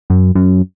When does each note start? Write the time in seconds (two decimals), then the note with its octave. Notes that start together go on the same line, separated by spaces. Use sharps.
0.10 F#2
0.35 F#2